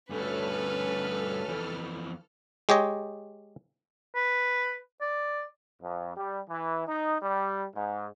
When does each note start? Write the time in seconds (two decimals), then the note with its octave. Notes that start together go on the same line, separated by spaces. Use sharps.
0.10 D2 G2 A3 C#4 A4 B4 G#5 F6
1.49 F2 E3
2.69 G#3 G4 C#5 D#5
4.15 B4
5.01 D5
5.81 F2
6.15 G3
6.48 E3
6.86 D#4
7.21 G3
7.74 G#2